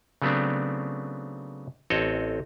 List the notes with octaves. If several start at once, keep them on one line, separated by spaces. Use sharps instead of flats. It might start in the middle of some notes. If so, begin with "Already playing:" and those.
C#3 F#3 A3 B3 C4 D4
A1 C4 A4 C#5 D#5